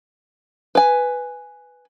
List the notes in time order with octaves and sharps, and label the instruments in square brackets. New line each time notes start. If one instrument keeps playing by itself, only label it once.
[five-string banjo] B4 G#5